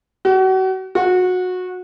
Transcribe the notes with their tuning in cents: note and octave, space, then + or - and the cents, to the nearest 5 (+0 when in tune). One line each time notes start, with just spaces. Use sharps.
F#4 +35
F#4 -20